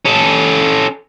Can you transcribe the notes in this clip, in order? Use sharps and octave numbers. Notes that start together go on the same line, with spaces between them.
C#4 A4